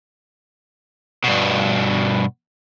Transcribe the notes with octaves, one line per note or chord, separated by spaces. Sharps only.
G2 B2